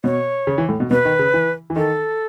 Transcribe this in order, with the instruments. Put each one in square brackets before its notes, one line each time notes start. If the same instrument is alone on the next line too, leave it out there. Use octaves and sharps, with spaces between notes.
[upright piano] B2 [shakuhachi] C#5
[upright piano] C#3
E3
A2
B2
[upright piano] B2 [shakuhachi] B4
[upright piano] D#3
C#3
E3
E3
[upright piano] D#3 [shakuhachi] A4